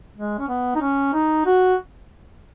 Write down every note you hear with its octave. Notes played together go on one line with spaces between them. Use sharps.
G#3
C#4
B3
D#4
C#4
D#4
F#4